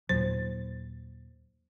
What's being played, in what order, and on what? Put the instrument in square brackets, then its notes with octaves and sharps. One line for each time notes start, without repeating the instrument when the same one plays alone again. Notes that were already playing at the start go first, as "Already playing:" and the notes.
[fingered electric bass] D#2 A#2 F#3 [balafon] C5